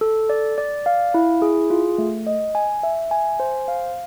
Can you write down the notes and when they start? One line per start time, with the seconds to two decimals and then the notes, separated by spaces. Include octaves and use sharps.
0.01 A4
0.30 D5
0.58 D5
0.86 F5
1.14 E4
1.42 G#4
1.70 F4
1.98 A3
2.27 D#5
2.55 G#5
2.83 E5
3.11 G#5
3.40 C5
3.68 F5